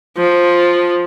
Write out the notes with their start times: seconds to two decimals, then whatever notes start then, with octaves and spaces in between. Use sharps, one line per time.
0.17 F3